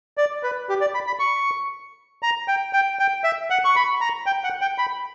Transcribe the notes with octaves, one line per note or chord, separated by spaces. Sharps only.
D5
B4
G4
D5
B5
B5
C#6
A#5
G5
G5
G5
E5
F#5
C#6
B5
A#5
G5
F#5
G5
B5